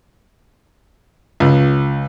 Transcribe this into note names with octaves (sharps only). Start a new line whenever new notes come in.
C#2